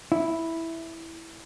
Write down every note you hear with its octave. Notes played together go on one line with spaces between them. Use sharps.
E4